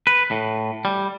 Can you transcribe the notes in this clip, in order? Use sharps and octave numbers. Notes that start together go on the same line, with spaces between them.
B4
A2
G3